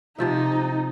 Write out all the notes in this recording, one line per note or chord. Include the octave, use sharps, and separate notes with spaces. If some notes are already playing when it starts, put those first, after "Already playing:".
C3 F3 D#4 E5